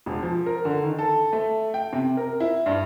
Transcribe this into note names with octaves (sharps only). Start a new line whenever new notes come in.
E1
F3
A#4
D3
D#3
A4
A3
G5
C3
A#4
E4
G2